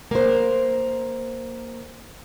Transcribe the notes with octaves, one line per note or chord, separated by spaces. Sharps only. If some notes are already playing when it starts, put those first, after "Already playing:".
A#3 C5